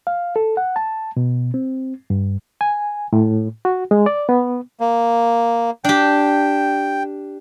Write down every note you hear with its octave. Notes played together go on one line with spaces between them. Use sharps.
F5
A4
F#5
A5
B2
C4
G2
G#5
A2
F#4
G#3
D5
B3
A#3
D4 G4 G5